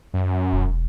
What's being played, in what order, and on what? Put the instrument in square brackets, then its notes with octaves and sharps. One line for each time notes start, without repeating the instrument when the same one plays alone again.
[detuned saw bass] F#2
[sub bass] E1